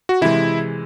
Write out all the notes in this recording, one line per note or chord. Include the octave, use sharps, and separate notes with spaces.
F#4
C3 E3 G#3 E4